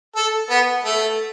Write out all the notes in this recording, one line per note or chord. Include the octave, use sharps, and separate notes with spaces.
A4
B3
A3